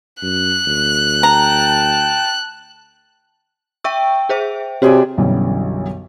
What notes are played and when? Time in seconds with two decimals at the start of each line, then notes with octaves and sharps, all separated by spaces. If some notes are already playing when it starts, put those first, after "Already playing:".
0.22 F#2 F#6
0.67 D2
1.23 G5 A5 A#5
3.84 E5 G5 C#6 E6
4.29 G#4 C5 E5
4.82 C3 C4 F#4 G#4 C#5 D5
5.18 B1 F#2 D3 E3 F#3 G3